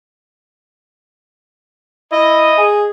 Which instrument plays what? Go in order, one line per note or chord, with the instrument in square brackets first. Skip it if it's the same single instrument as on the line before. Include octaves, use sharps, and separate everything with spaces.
[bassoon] E4 [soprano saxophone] D#5
[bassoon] G#4